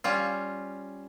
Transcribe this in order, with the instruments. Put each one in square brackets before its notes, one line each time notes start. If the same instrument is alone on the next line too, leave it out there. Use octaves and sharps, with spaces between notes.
[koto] G3 C#4 F4